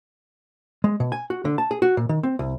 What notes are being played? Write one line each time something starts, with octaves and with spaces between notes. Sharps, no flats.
G#3
B2
G#5
F#4
D3
A5
G#4
F#4
A#2
D#3
C4
C2